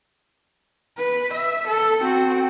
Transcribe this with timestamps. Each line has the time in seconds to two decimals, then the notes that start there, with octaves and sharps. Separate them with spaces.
0.98 B4
1.34 E5
1.67 A4
2.01 C4 F#4